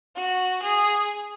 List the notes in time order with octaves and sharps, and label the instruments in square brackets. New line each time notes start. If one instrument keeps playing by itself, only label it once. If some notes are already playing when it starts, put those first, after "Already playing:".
[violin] F#4
G#4